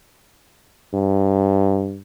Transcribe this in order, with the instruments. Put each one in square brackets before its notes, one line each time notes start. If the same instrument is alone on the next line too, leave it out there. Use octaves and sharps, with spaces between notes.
[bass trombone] G2